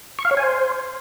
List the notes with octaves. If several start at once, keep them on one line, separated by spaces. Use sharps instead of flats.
C#6
F5
C#5
G#5
C5